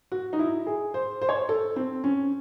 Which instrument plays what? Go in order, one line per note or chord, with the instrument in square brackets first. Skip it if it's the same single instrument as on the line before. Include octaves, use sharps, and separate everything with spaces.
[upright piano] F#4
D#4
E4
G#4
C5
C5
C#5
C5
A4
C4
C#4